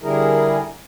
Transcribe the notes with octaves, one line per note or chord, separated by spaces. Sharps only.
D3 G3 E4 G#4 A#4